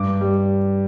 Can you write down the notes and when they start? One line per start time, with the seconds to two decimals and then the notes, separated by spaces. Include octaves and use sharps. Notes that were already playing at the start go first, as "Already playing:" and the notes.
Already playing: G2 D6
0.21 G3